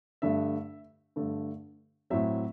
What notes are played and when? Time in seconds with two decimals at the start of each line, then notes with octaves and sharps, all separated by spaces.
0.22 G2 D3 A3 E5
1.16 G2 D3 A3
2.10 A2 F#3 C4 E5